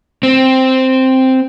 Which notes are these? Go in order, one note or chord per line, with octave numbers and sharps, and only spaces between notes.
C4